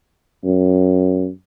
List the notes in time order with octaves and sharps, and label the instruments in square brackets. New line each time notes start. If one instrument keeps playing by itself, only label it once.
[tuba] F#2